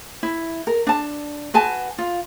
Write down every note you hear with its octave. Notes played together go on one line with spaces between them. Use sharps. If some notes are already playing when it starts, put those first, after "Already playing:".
E4
A#4
D4 A5
F#4 B4 G#5 A5
F4